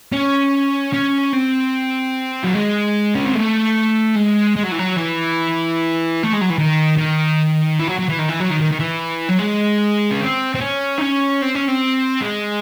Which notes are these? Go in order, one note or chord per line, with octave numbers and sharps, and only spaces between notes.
C#4
C#4
C4
F#3
G#3
C#4
C4
A3
G#3
G#3
F#3
E3
F#3
E3
A3
G#3
F#3
E3
D#3
D#3
E3
F#3
F#3
E3
D#3
E3
F#3
D#3
D#3
D#3
E3
F#3
G#3
C#4
C4
C4
C#4
D#4
C#4
C4
C#4
C4
G#3